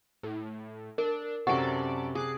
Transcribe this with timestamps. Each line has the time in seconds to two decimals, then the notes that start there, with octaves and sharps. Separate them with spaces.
0.23 A2
0.98 D4 A#4
1.47 F#2 C3 F#3 A4 D5 F#5 C#6
2.15 G#4 D6 F#6 C7